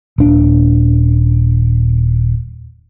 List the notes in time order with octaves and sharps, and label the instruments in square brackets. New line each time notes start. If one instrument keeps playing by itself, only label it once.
[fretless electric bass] D#1 D4